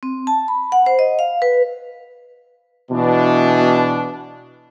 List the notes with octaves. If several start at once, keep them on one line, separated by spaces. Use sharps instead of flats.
C4
A5
B5
F#5
C5
D#5
F5
B4
B2 E3 D4